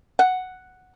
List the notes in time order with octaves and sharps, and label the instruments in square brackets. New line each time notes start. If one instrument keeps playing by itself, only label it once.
[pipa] F#5